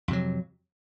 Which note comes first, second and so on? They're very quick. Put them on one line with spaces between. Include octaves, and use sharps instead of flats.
F2 C3 F#3